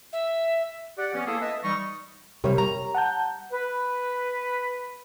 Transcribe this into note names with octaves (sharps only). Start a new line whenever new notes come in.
E5
G4 D5 F#5
E3 B3 C#4
A#3 E4 G#4 A4
B4 D#5 E5 A5
E3 G3 D#4 C#6
C3 G3 G4 A#4 C#5
A#5
F#5 A5 G6
B4